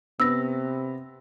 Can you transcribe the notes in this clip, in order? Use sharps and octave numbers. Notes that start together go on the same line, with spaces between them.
C3 B3 E6 A#6